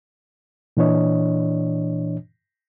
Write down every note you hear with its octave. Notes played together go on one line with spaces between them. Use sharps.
A#2 E3 D4 C#5 D#5